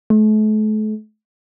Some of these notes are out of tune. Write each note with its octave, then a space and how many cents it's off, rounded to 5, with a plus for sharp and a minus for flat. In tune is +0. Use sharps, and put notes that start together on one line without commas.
A3 -40